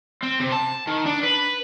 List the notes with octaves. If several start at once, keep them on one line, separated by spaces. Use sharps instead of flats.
C4
C3
A5
D#3
D4
B4